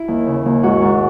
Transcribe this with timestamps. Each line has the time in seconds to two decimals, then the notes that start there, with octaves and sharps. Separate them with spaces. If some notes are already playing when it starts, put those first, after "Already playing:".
Already playing: E4
0.08 D#2
0.26 C#3
0.46 D#2
0.63 G#2 F#4
0.82 G#2